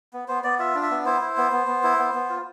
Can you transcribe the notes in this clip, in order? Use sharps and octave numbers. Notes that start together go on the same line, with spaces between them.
B3
B3 C5
B3 D5
F4 E5
D4
E5
B3
E4 C5
E4
B3
B3
B3
E4
B3
B3
F4